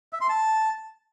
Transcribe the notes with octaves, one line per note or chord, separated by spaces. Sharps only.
E5
C6
A5